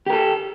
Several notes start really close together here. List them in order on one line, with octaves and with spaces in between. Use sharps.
G4 A#4 A4